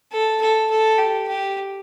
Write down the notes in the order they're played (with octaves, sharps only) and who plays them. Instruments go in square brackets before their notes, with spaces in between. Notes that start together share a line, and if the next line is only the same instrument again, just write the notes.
[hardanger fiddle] A4
A4
A4
G4
G4